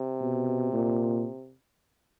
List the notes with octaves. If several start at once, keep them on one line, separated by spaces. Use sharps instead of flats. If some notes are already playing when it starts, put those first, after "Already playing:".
Already playing: C3
B2
A#2